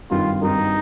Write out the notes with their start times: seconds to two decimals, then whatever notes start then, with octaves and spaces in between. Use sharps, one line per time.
0.10 G#1 G2 D#3 F4
0.42 G#1 G2 D#3 D#4